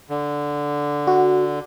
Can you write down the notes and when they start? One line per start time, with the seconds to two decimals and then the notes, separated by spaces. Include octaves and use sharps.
0.09 D3
1.07 F#4